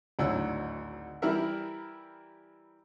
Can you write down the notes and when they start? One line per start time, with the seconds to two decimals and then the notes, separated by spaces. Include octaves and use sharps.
0.19 G#1 D2 A2 F#3 E6
1.22 E3 G3 E4 G4 A#4 E5